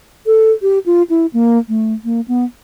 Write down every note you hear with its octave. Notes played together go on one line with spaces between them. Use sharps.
A4
G4
F4
E4
A#3
A3
A#3
B3